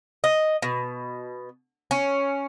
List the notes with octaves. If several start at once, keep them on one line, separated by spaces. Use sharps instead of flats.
D#5
B2
C#4